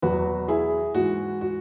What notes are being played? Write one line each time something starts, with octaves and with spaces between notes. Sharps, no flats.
E2 B2 F#3 F#4 B4
E4 G#4
G#2 E3 F#4
F#4